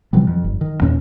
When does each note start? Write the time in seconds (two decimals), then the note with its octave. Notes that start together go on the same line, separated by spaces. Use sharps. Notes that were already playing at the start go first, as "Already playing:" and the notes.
0.13 C3 E3 F#3 G3
0.27 F2
0.44 G1
0.61 D#3
0.81 E2 A#2 C#4